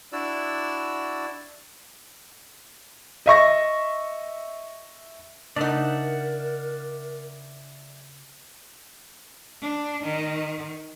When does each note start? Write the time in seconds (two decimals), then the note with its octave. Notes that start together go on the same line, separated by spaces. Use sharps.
0.13 D4 E4 F#4 D5 E6
3.26 D#5 E5 C#6 A#6
5.56 C#3 D4 D#4 A#4 D5 E5 F#5
9.61 D4
10.04 D#3